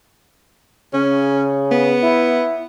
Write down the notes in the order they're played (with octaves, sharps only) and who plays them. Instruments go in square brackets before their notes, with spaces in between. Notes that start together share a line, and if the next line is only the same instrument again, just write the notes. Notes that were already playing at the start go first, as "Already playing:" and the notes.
[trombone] C#3 [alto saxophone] C#4
[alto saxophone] B3
[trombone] E4